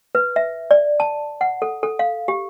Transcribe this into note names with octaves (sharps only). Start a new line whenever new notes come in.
B4
E5
D5
A5
F#5
A4
A4
F5
G4